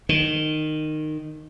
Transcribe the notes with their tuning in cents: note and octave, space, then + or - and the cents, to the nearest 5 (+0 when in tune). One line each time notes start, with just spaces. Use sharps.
D#3 -15